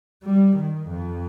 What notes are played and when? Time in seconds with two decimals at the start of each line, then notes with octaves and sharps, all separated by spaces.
0.24 G3
0.56 D#3
0.90 F2